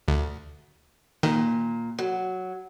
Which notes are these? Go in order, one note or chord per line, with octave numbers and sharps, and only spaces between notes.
D2
A#2 D#3
F#3